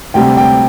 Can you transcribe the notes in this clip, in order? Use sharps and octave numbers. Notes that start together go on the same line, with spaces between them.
D2 C3 G3 G5
G5